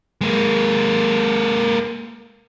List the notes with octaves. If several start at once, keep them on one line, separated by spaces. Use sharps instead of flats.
G#3 A#3